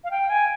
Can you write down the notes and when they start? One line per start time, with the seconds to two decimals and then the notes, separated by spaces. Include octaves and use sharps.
0.04 F5
0.11 G5
0.30 G#5